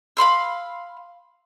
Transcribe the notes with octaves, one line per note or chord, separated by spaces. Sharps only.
F5 B5 C6 E6